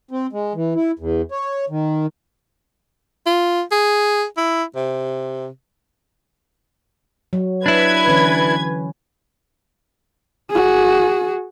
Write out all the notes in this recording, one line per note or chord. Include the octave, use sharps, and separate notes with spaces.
C4
G#3
E3
E4
E2
C#5
D#3
F4
G#4
E4
C3
F#3
D4 E4 B4 G#6
D3 E3 C#4
F#4 G#4